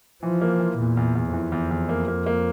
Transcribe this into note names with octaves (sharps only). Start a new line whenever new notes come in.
E3 F3
A#3
E3
E2 A#2
E2
E2
F2 E3
E2
E2
A#3
A#3
A#3